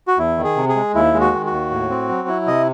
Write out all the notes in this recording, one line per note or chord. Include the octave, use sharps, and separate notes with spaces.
F#4
E2 E4
D#3
G#4
C3
G#4
G#3
D#2 E4
G#3
F#4
D#3
F#4
D#2
A2
C4
F#3
E4
C3 D#5